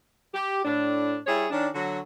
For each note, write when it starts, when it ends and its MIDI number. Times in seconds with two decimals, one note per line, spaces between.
0.34 0.60 67
0.65 1.17 45
0.65 1.17 62
1.27 1.47 55
1.27 1.47 64
1.27 1.47 68
1.27 1.47 73
1.51 1.68 51
1.51 1.68 61
1.51 1.68 62
1.75 1.98 50
1.75 1.98 54
1.75 1.98 66